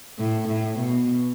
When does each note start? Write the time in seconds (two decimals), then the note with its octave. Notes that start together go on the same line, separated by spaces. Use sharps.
0.19 A2
0.48 A2
0.79 B2